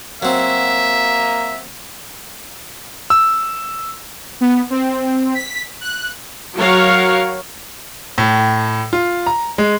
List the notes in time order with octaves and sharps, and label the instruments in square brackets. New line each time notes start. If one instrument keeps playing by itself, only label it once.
[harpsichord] F#3 C4 [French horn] A#3 [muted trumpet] E5
[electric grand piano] E6
[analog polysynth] B3
C4
B6
F#6
[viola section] F#3 A#4 C#5 F5
[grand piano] A2
F4
A#5
G#3